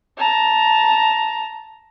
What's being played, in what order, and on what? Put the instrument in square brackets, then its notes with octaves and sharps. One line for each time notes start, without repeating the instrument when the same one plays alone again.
[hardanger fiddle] A5 A#5